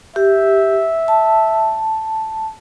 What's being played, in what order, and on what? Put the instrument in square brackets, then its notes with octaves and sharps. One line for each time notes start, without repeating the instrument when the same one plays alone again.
[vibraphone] G4 [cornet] E5
[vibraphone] A5